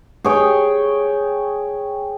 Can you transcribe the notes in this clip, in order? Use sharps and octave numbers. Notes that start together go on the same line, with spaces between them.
G#4 C#5 G5